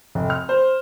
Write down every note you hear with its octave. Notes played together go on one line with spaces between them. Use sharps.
F1
F6
C5